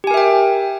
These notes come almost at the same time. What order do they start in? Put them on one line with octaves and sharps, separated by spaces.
G4 G#5 A#4 E5 G5